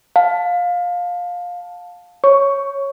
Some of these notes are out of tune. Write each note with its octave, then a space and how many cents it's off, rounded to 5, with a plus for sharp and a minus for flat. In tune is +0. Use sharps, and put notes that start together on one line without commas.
F5 +20 A5 +0
C#5 -5 C#6 +10